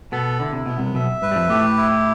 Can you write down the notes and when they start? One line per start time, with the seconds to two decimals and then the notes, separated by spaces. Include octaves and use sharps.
0.12 B2 B3 A4
0.40 D3 E4
0.53 C3
0.66 B2 B3
0.78 C2 C3
0.94 B1 B2 E5
1.22 G2 B4
1.32 G3
1.36 F2 F3
1.49 A2 A3 G4
1.77 E4